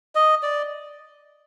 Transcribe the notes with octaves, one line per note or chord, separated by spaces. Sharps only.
D#5
D5